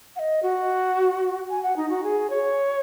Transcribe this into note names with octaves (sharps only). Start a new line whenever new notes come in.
F#5
D#5
F#4
G#5
F#5
D#4
F#4
G#4
C#5